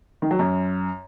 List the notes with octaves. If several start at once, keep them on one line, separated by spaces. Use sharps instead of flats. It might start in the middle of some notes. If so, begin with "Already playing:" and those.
D#3
F#3
F#2